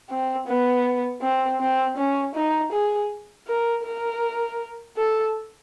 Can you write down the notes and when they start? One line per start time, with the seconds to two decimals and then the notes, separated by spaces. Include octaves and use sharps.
0.10 C4
0.48 B3
1.22 C4
1.61 C4
1.97 C#4
2.35 D#4
2.72 G#4
3.48 A#4
3.84 A#4
4.97 A4